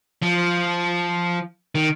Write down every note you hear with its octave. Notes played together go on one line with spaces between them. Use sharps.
F3
D#3